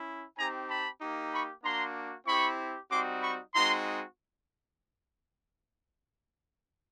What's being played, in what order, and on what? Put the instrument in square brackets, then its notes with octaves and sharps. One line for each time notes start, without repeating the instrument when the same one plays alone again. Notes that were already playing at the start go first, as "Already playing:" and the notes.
Already playing: [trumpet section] C#4 E4
C4 D#4 G4 G#5 A#5
A5 B5
A#3 D#4 G4
B5 C#6
A#3 D4 F#4 A#5 C6
C4 E4 G4 B5 C#6
G3 C4 D#4 F#4 C6 D6
B5 C#6
G#3 C4 D#4 F#4 A#5 C6